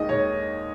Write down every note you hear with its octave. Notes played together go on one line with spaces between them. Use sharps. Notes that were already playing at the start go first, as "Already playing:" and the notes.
Already playing: D#2 D#3 G#3 D#5
C#5